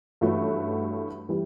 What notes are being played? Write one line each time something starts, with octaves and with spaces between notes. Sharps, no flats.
G2 E3 A3 C#4 F#4
E3 G3